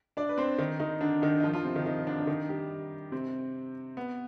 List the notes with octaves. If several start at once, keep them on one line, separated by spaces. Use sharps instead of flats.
D4 D5
B4
C4 C5
D#3 D#4
D#3 D#4
D3 D4
D#3 D#4
D#4
F3 F4
F3 F4
C3 C4
D#3 D#4
D#3 D#4
D3 D4
D4
D#3 D#4
G3 G4
C3 C4
B3